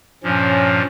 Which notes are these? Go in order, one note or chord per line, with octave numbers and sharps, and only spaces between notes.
G2 A#2 F3 C#4